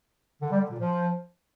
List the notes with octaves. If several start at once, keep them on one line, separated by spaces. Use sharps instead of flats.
D3
G3
D3
A#2
F3